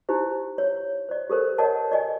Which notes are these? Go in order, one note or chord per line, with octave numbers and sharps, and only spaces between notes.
D#4 E4 G4 C5
C#5
C5 D5
G4 A4 A#4 C5
A#4 C#5 D#5 F#5 A5
D5 D#5 G#5